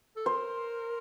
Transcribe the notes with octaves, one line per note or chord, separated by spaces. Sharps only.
A4
A#4 C5